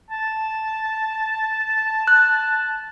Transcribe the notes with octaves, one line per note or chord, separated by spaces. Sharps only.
A5
F#6